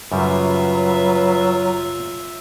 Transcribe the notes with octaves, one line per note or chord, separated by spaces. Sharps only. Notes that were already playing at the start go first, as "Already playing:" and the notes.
F#2 C#3 F#3 G3 F4 B4 E5